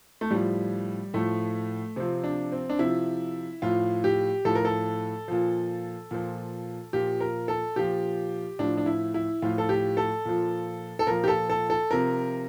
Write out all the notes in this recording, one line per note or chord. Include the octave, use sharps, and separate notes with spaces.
A3
A2 F3 G3
A2 F3 A3
C3 F3 C4
D4
C4
D4
C3 F3 E4
A2 F3 F4
G4
A2 F3 A4
A#4
A4
A#2 F3
A#2 F3
A#2 F3 G4
A#4
A4
A#2 F3 G4
A2 F3 D4
D4
E4
E4
A2 F3 F4
A4
G4
A4
A#2 F3
A4
A#2 F3 A#4
G4
A4
A4
A4
C3 F3 A#4